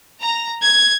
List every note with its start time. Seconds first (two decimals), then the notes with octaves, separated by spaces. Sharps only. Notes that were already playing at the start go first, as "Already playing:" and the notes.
0.21 A#5
0.62 G#6